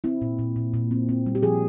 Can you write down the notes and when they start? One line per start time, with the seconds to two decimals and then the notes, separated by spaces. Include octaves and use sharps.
0.04 C4 E4
0.22 A#2
0.39 A#2
0.56 A#2
0.74 A#2
0.91 C4
1.09 C4
1.26 G3
1.35 G4
1.43 F3 G#4